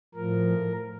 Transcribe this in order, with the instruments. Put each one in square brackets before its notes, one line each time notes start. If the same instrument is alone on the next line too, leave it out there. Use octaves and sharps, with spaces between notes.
[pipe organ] A2 F3 A#4